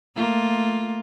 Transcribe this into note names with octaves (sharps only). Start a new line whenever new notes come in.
A3 A#3 F4